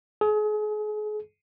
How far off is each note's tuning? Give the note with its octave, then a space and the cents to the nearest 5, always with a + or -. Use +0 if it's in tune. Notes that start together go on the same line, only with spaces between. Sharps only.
G#4 +35